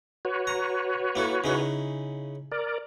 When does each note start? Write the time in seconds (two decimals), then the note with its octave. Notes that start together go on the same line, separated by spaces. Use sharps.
0.25 F#4 B4 C#5
0.47 A#5
1.15 A#3 E4 A4
1.44 C#3 D#4 E4
2.52 A#4 D5